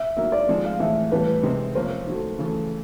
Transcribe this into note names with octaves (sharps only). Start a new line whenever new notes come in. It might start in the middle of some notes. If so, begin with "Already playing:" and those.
Already playing: E5
D#3 F#3 A#3 E5
D5
F3 G#3 C4 D#4
F5
A2 E3 G#3 E5
A2 E3 G3 B4
C3 D#3 G#3 C4 D#4
C3 F3 A#3 C#4 C5
D#3 F#3 A3
C#3 E3 A3